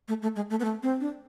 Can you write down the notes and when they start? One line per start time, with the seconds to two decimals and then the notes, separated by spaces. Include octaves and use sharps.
0.08 A3
0.22 A3
0.36 G#3
0.50 A3
0.60 B3
0.64 A3
0.83 C4
1.00 D4